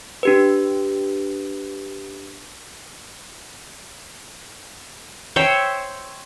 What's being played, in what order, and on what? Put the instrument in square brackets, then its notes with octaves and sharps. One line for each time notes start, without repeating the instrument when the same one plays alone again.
[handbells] D4 G4 B4
[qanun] C5 C#5 E5 G5